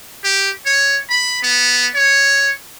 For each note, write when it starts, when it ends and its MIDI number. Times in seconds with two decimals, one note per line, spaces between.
0.23 0.50 67
0.65 0.98 73
1.10 1.42 83
1.42 1.88 59
1.94 2.51 73